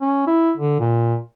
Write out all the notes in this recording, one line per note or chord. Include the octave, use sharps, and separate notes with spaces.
C#4
E4
D3
A#2